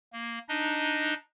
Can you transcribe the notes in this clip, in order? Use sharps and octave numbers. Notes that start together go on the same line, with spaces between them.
A#3
D4 D#4 D#5